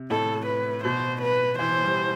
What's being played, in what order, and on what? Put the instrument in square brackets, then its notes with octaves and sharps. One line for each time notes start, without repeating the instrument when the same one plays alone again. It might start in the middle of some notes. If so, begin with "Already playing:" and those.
Already playing: [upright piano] C3
[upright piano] A2 [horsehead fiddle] A4
[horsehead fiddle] B4
[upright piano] B2 [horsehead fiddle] C5
[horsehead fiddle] B4
[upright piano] E3 [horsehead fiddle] C5
[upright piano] G3